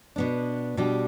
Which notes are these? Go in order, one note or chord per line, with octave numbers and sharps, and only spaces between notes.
B2 B3 D4
B2 G3 D4 G4